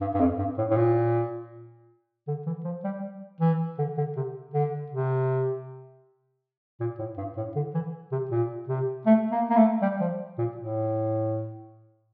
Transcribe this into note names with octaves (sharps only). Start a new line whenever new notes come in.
G2
G2
F2
G2
A2
A2
A#2
D3
E3
F3
G3
E3
D3
D3
C3
D3
C3
A#2
A2
G2
A2
D3
E3
C3
A#2
C3
A3
A#3
A#3
A3
G3
F3
A#2
A2